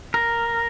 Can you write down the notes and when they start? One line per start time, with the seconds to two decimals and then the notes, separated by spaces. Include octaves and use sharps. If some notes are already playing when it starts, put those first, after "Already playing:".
0.14 A#4